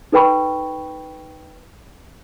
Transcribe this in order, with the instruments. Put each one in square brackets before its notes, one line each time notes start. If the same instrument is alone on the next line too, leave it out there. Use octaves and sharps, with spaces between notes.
[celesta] D#4 A4 B4 G5 B5 C#6